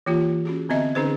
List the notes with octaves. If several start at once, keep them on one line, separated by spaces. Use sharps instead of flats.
E3 A#3 F4 G4
C#4 F#4 G#4
D3 B3 C4 D#5 E5
D3 C#4 D#4 G#4 B4 C5